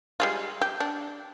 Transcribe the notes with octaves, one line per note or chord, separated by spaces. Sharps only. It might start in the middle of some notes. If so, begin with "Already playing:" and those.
G3 G#3 F4
G4
D4